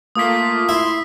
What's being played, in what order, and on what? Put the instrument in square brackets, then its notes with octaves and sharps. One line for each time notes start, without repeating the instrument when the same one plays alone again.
[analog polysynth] A3 A#3 F4 [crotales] D#6 B6
[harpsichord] E4 [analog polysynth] C6